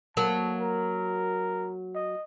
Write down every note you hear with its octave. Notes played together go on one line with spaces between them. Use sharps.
F#3 A#3 A5
A#4
D#5